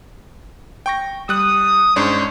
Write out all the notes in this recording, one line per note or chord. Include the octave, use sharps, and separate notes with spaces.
G5 C#6 A#6
G3 D#6 F#6
G#2 C#4 D4 C5 C#5